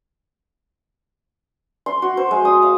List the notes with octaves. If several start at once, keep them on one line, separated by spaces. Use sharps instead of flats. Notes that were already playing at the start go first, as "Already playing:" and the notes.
C6
F#4
C5
G#3
D#6
F5